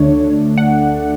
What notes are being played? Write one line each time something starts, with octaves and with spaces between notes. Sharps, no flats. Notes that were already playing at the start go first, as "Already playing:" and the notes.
Already playing: D2 D3 A3 D4 C#5
F#5